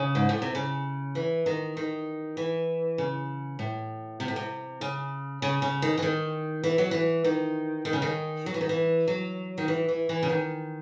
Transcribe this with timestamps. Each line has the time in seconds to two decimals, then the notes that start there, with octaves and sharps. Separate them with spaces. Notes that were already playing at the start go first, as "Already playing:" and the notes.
Already playing: C#3
0.15 G#2
0.29 A2
0.42 C3
0.55 C#3
1.15 E3
1.46 D#3
1.77 D#3
2.37 E3
2.98 C#3
3.59 A2
4.20 C3
4.28 A2
4.36 C3
4.81 C#3
5.42 C#3
5.62 C#3
5.82 D#3
5.98 E3
6.02 D#3
6.63 E3
6.78 F#3
6.91 E3
7.24 D#3
7.85 D#3
7.93 C#3
8.02 D#3
8.46 F#3
8.54 E3
8.61 D#3
8.69 E3
9.08 F#3
9.58 D#3
9.68 E3
9.88 E3
10.09 E3
10.23 C#3
10.30 D#3